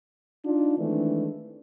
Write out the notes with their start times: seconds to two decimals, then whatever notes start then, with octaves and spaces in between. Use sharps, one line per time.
0.45 D4 D#4 F4
0.78 D#3 E3 G#3 A3 C4 D4